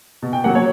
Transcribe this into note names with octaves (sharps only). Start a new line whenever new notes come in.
B2
G5
F#3 A#3 F#5
C#5